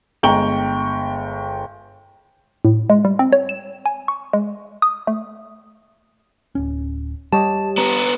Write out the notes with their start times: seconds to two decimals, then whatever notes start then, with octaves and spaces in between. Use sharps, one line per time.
0.23 G1 G#3 G5 A#5 C#6 G7
2.65 A2
2.90 G#3
3.05 G3
3.19 C4
3.32 C#5
3.49 E7
3.86 G#5
4.08 C#6
4.33 G#3
4.82 D#6
5.07 A3
6.55 D1 C#4
7.33 G3 G4 C#5 D#5 A5
7.78 B3 D4 A#5